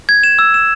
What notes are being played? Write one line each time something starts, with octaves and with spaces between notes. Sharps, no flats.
G#6
E7
E6
E7